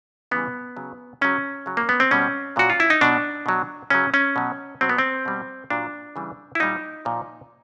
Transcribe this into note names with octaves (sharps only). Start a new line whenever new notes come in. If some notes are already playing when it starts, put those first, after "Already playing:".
C#3 E3 G3 B3
C#3 F#3
C#3 F#3 C#4
C#3 F#3
A#3
B3
C4
B2 G3 C#4
A#2 F#3 F#4
F4
E4
D#4
B2 F#3 D4
B2 F#3
C#3 F#3 C#4
C#4
B2 F#3
B2 F#3 C4
B3
C4
B2 G3
A#2 F#3 D4
C#3 E3 G3
E4
A#2 G3 D#4
A#2 F3